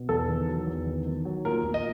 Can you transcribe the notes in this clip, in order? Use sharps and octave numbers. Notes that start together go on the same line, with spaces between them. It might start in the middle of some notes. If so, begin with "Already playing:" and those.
Already playing: B2
E2 A4
D#3
F#3
E2
D#3
D#3
F#3
A#2 A#4
A#2
D#5